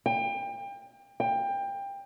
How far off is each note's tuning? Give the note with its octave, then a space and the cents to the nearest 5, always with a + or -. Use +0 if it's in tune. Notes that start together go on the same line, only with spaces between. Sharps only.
G5 +30
G5 +20